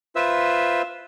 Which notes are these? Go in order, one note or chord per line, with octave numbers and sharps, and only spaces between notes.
F4 B4 C5 E5 E6